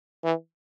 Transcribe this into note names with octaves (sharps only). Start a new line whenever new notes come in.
E3